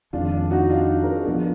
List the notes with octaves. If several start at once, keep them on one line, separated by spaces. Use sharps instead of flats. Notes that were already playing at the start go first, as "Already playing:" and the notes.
F2 D#3 G#3 D4 F4
D4
D#4 F#4
D4 F4
D#4
A#4
F4 G#4
F3 B3 D4 F4 G#4